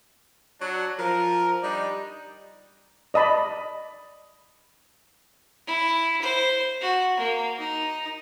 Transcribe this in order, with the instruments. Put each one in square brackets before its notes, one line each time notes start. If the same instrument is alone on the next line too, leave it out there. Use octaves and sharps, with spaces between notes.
[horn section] F#3 D4
F3 A#4
G3 D4 D#4
[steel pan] D5 D#5 A5 B5
[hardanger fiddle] E4
C5
F#4
A#3
D#4